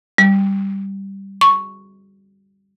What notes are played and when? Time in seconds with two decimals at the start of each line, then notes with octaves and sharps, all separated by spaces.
0.18 G3
1.41 C#6